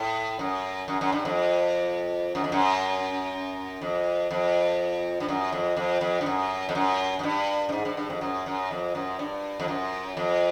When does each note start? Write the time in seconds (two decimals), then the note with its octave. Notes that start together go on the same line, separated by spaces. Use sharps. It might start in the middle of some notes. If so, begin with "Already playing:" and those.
Already playing: A2
0.39 F#2
0.88 F#2
1.01 F#2
1.12 G2
1.25 F2
2.35 F#2
2.44 F2
2.52 F#2
3.82 F2
4.31 F2
5.20 G2
5.28 F#2
5.52 F2
5.77 F2
6.01 F2
6.21 G2
6.26 F#2
6.69 F2
6.75 F#2
7.19 F#2
7.23 G2
7.69 G2
7.72 G#2
7.85 G2
7.97 G2
8.10 F2
8.21 F#2
8.46 F#2
8.71 F2
8.95 F#2
9.19 G2
9.60 F2
9.68 F#2
10.17 F2